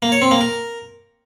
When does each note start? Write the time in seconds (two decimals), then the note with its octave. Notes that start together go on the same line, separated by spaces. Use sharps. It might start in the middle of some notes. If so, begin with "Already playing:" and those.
0.02 A#3
0.12 C#5
0.22 C4
0.31 A#3
0.41 A#4